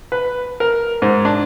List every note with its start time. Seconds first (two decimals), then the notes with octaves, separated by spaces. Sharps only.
0.12 B4
0.60 A#4
1.02 G#2
1.25 D4